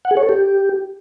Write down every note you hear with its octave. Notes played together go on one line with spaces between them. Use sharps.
F#5
G#4
C#5
A4
G4